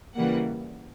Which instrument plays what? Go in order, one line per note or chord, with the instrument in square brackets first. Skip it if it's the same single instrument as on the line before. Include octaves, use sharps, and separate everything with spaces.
[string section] C#3 E3 G3 A#3 F#5